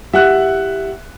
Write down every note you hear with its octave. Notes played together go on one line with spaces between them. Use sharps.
E4 G4 E5 F#5 F#6